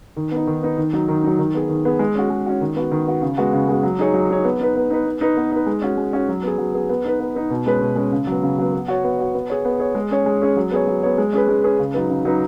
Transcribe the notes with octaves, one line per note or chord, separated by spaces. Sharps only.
D#3
B3 D#4
D#3
B3 D#4
D#3
F#3 D#4
D#3
F#3 D#4
D#3
B3 G#4
D#3
B3 G#4
G#3
C#4 F#4
G#3
C#4 F#4
D#3
B3 F#4
D#3
B3 F#4
C#3
G#3 B3 F#4
C#3
G#3 B3 F#4
F#3
D#4 G#4 C#5
F#3
D#4 G#4 C#5
B3
D#4 B4
B3
D#4 B4
B3
D#4 B4
B3
D#4 B4
G#3
C#4 F#4
G#3
C#4 F#4
F#3
B3 G#4
F#3
B3 G#4
B3
D#4 B4
B3
D#4 B4
B2
G#3 C#4 B4
B2
G#3 C#4 B4
C#3
F#3 B3
C#3
F#3 B3
B3
F#4 C#5
B3
F#4 C#5
B3
G#4 C#5
B3
G#4 C#5
G#3
C#4 G#4 C#5
G#3
C#4 G#4 C#5
F#3
B3 G#4 C#5
F#3
B3 G#4 C#5
G#3
C#4 G#4 B4
G#3
C#4 G#4 B4
C#3
F#3 D#4 B4
C#3
F#3 D#4 B4